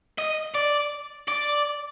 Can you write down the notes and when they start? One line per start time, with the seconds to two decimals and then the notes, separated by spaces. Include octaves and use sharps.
0.19 D#5
0.55 D5
1.28 D5